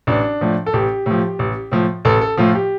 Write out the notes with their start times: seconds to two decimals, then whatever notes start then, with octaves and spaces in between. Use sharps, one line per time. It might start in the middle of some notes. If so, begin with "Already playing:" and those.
0.07 A1 D4
0.41 A2 F3
0.66 A4
0.73 A1 G4
1.06 A2 F3
1.39 A1
1.72 A2 F3
2.05 A1 A4
2.21 A4
2.37 A2 F3 F4
2.55 G4